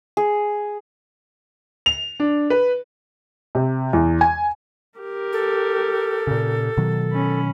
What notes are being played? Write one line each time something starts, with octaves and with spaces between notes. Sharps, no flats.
G#4
F7
D4
B4
C3
E2
G#5
G4 A#4
A4
A#2 C#3
B2 D#3 F#3
C#4 B5